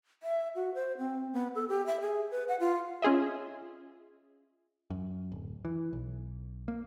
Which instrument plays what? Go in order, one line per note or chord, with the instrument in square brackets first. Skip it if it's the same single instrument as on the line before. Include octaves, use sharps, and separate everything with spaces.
[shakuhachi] E5
F#4
C5
C4
B3
A4
G4
E5
G#4
B4
F#5
F4
[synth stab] C#4 F4 G#4 D#5 E5
[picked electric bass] F#2
D1
E3
B1
A#3